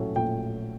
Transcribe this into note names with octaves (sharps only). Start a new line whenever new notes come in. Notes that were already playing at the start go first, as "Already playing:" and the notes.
Already playing: A#1 A2 F#3 A3 C#4
A#1 G5